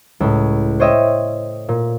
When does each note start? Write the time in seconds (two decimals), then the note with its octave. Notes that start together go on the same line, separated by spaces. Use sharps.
0.20 C#2 A2
0.80 C5 C#5 D#5 E5 G5
1.69 A#2